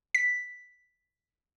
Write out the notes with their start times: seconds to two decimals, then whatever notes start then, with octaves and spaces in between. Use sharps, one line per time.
0.15 B6